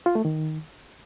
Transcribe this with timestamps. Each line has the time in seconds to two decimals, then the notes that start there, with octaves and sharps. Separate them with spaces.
0.06 F4
0.15 A3
0.25 D#3